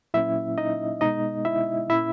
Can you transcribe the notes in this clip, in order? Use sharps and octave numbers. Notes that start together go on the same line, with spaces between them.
A#2 F#3 A#3 C#4 E4 E5
D#4 D#5
B2 G#3 B3 D#4 D#5
E4 E5
A#2 A#3 C#4 E4 E5